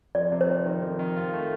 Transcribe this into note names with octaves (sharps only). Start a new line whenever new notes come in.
F2 D5
C3
C5
F2
D#3
F2
D#3
F4
A3